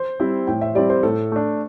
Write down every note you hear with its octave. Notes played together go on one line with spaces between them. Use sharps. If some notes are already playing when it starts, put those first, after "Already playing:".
Already playing: C5
G3 C4 E4
A2 G5
E5
G3 C4 E4 D5
C5
A2 A4
A3 D4